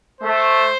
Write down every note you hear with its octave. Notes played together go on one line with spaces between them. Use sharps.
A3 C5